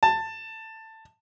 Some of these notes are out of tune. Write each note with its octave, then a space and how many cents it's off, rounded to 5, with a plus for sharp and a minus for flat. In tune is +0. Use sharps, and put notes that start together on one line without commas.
A5 +15